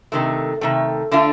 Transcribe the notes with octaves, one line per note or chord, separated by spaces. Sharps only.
C3 D#3 A3
C3 D#3 A3
D3 A3 D4 F4